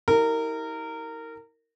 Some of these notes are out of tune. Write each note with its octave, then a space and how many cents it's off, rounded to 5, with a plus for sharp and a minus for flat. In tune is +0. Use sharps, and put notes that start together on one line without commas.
E4 -45 G4 +0 A#4 -20